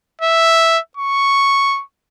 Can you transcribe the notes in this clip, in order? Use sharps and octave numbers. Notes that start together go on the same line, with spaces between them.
E5
C#6